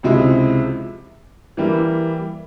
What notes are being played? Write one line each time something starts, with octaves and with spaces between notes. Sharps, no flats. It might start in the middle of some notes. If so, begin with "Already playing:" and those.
C#2 C3 F3 G#3 E4
E3 G3 A#3 E4